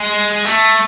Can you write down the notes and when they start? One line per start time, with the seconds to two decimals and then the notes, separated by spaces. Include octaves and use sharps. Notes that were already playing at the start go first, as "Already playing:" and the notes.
Already playing: G#3
0.45 A3